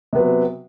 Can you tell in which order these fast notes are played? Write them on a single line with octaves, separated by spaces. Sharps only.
C3 B3 F#3